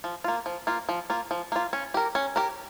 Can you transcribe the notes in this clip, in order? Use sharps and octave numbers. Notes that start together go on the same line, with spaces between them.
F3
A#3 F4
F3
A#3 F4
F3
A#3 F4
F3
A#3 F4
C#4
G4 A#4
C#4
G4 A#4